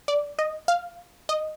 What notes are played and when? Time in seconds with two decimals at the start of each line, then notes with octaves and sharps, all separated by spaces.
0.08 D5
0.39 D#5
0.68 F5
1.29 D#5